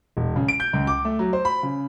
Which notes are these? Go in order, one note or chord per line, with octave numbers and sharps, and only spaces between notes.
E1
C#3
D7
G6
C#2
D6
A3
F#3
C5
B5
C#3